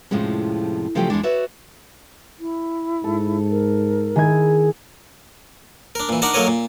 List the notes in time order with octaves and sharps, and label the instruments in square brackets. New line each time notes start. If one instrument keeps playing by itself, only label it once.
[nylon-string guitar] F2 A2 C3 F3 G#3 C#4
C#3 F3 F#3 A3 G4 G5
E2 F#3 G#3 D4
F#4 B4 C#5 D5 E5
[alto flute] E4
[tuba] G#2 [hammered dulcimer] A4
[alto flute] A#4
[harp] D#3 G#6 [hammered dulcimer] E4 G#4
[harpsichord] D4 A#4
A#2 E3
D4 D#4 A#4 D5 F#5 A5
F#3 A#3 A4 A#4 C#5 D#5
A#2